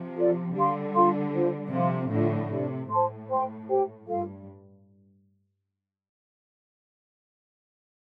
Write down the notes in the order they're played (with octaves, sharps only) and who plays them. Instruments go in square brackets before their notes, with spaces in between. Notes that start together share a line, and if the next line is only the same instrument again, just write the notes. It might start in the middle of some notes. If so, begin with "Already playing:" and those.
Already playing: [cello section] C3 F3
[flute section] F4 A4 D5
[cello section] D3 G3 [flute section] G4 F5 C6
[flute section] F4 A4 F5 C6
D4 F4 C5
[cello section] C3 F3 [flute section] C5 F5 C6
[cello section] A2 D3 [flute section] D4 F4 D5
[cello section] C3 [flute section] D4 G4 D5
[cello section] A2 [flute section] C5 A5 C6
[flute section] C5 G5 C6
G4 C5 G5
[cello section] G2 [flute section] F4 A4 F5